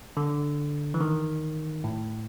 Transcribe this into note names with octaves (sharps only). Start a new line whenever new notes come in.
D3
E3
D#3
A2